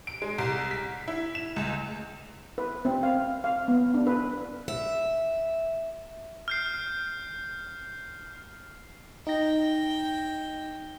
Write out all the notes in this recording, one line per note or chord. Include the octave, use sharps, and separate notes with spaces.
D7
G#3
C2
B6
E4
E7
C#2
B4
C4
F5
F5
B3
D4
B4
E5
F6 G6 C7
D#4 G5 A#6